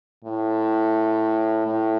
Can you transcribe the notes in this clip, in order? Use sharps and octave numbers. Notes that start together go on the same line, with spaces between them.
A2
A2